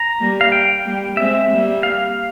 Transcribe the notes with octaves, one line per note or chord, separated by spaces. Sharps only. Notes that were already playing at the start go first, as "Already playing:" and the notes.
Already playing: A#5
G3 A#3
F5
G5
G3 A#3
G#3 C4 E5
G3 A#3
F5